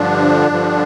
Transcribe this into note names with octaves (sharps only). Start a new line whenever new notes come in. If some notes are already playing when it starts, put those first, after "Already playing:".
Already playing: G2 D3 F3 D4
G2 D3 F3